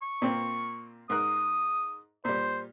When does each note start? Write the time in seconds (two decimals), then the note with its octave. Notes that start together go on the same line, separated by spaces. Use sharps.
0.02 C#6
0.22 A#2 A#3 C4
1.10 G#2 A#4 D#6 F#6
2.25 A#2 G3 C5